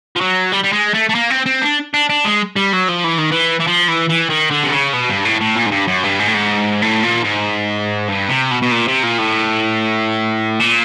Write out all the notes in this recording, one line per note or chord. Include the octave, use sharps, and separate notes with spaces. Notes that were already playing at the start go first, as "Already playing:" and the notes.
F3
F#3
G3
G3
G#3
A3
A3
A#3
C4
C4
D4
D4
D4
G#3
G3
F#3
F3
E3
D#3
E3
E3
F3
E3
E3
D#3
D3
C3
C#3
B2
G2
A2
A2
A#2
G#2
G2
F#2
G2
G#2
A2
G#2
A2
A#2
G#2
G2
C3
B2
B2
A#2
C3
A#2
A2
A#2